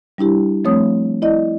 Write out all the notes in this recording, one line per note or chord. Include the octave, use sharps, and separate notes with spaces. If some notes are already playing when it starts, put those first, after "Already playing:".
G3 D4 E4 G4
F3 A3 C4 C#5 D#6
E4 D5 D#5